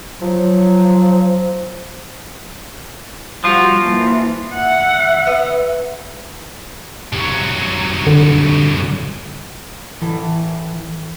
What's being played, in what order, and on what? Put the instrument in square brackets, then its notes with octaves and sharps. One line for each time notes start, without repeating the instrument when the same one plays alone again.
[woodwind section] F3 F#3
[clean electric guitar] F3 F4 [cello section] G3 F#4
[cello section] E3 A#3
[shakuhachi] E5 [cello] F#5
[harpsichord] B3
[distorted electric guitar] C2 F#3
[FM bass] D3
[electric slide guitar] E3 A4